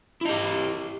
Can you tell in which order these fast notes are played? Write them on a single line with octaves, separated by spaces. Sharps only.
E4 D#5 G4